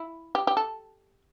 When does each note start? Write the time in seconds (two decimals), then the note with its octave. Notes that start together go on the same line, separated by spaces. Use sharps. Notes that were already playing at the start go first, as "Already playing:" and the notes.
Already playing: E4
0.35 G4
0.47 G4
0.57 A4